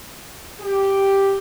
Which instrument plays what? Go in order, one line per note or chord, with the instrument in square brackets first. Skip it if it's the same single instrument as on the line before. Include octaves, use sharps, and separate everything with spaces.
[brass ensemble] G4